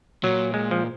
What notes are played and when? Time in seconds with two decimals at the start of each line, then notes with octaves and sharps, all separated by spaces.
0.23 A#2 F#3
0.54 G#3
0.71 F3